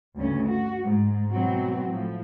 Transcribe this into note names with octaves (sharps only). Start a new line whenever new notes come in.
D2 G2 C#3 A3 C#4
F#4
G#2
B2 E3 F#3 C4 F#4
A2 F3